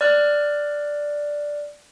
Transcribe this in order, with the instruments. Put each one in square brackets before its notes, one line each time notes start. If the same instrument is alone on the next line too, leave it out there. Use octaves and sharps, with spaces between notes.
[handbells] D5 F6 F#6